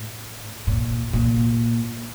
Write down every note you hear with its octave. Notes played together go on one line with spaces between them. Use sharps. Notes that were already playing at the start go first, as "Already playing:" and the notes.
Already playing: A2
A#2
A#2